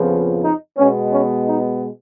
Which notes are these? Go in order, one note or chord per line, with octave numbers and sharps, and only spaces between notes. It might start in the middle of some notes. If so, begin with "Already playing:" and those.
Already playing: F2 C#3 F3 B3
D#4
B2 G#3 B3 C#4
C#4
D#4